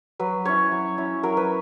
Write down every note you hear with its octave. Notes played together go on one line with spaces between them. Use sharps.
F#3 B4
C#4 E4 C#5
F#3
C#4 E4
F#3 A#4
B4